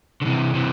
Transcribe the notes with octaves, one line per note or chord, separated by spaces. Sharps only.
D3
C3 E3
C3 E3